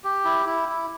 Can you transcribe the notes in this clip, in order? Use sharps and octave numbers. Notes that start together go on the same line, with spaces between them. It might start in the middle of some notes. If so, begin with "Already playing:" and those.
G4
E4
E4
E4